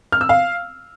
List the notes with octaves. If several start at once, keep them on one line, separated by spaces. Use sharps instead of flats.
F6
E6
F5